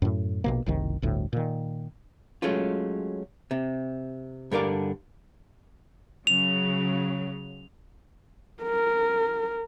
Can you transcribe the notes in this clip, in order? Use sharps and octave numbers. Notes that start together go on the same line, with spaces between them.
F#2 A2
A#1 B2 A#3
F#1 C2 D#3
G1 D2 A2
A#2 D#3
F#3 G#3 A3 C#4 F4
C3
G2 D3 A#4 D5 F5
C#3 F#3 F7
A#4